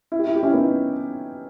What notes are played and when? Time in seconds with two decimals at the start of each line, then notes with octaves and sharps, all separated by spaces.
0.12 E4
0.19 G4
0.27 E4
0.36 G4
0.43 C#4 E4
0.54 B3 D#4